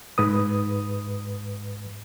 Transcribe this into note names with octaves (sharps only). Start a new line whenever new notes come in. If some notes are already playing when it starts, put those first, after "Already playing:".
G#2 B4 D#6